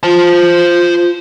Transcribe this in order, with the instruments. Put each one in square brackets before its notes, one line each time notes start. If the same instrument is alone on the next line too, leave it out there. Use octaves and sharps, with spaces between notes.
[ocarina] F4 [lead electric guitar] C5 A5